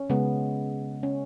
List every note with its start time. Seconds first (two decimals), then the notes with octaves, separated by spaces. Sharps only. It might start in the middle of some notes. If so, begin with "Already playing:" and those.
Already playing: C#4
0.10 C#3 G#3 B3
1.03 C#4